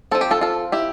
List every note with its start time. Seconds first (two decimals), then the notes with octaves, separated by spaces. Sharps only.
0.11 F3 C4 A4
0.21 G4
0.31 F4 A4
0.41 F4 A4
0.72 E4 G4